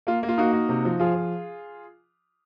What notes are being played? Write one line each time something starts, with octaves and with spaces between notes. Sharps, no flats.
A#3 F4
A#3
F4
A#3 D#4 F#4
A#3
C3
F3
F3 F4 G#4
F3